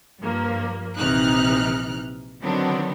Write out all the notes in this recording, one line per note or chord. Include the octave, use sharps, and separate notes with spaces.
G2 F3 A#3
A#1 C3 E3 D#4 F6 F#6
D3 D#3 F#3 B3 C4 D4